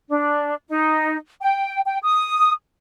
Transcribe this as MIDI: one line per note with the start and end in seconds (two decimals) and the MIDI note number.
0.09 0.54 62
0.69 1.16 63
1.41 1.80 79
1.85 1.99 79
2.04 2.52 87